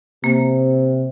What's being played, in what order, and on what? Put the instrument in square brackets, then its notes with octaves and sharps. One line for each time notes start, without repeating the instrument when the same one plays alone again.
[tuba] C3 [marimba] A#3